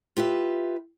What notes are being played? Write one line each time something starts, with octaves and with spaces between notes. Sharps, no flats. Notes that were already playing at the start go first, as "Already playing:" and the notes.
F4 G4 B4 E5